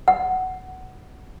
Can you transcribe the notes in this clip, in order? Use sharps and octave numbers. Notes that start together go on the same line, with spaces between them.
F#5